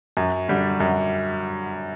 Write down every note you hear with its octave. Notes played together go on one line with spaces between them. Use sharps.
F#2
D3 G3 D4
F#2